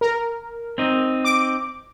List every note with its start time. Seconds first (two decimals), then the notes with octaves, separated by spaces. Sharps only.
0.01 A#4
0.78 C4 D#4
1.24 D6